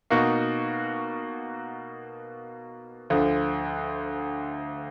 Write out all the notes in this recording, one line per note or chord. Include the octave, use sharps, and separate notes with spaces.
B2 A#3 D#4 F#4
D2 D3 F3